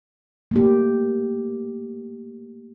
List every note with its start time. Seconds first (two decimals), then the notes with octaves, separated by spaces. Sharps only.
0.51 A3 A#3 G4